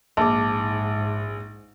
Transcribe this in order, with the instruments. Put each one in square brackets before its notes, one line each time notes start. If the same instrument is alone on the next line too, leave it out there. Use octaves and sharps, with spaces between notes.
[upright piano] A#1 [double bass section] G#2 [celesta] A5 D6